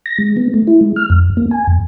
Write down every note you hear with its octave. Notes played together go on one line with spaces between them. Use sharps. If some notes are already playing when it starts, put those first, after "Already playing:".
A#6
G#3
B3
A3
E4
G#3
F6
F2
A#3
G#5
F2